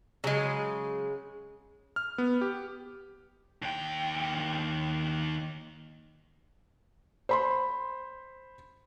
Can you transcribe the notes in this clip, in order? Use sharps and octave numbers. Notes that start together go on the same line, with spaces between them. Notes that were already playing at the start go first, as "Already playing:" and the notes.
C#3 F#3 G#3
F6
B3
G4
D#2 G5
C5 B5 C6